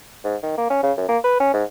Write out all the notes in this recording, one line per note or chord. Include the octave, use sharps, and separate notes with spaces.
G#2
D#3
A#3
C#4
C#3
F#2
A#3
B4
C#4
G#2